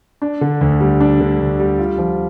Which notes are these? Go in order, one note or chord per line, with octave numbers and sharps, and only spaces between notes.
D4
D3
D2
G3
D4
D3
D2
G3
F4
F3